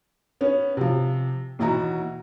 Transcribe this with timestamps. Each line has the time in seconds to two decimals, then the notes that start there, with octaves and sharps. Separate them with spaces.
0.41 B3 C#4
0.77 C3 F3
1.59 D#2 B2 E3 E4 F#4 A#5